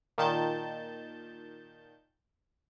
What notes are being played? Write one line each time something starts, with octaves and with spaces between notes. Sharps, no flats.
A#2 D#3 A5 G6